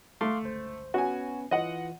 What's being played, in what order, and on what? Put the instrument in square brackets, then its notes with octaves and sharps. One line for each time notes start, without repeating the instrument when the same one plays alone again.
[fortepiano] A3 [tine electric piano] F5 C6 D6
[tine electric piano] G1 C#2 C5
[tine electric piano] B3 C#4 B4 [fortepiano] F#4 G#5
[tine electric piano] E3 F4 [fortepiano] D#5 F#5